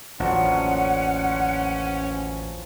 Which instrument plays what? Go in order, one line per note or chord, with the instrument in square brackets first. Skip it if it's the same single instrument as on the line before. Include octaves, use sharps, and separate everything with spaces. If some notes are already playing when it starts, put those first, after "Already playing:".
[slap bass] A1 D#2 [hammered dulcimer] D3 F3 F#3 [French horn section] C#4 [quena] F#5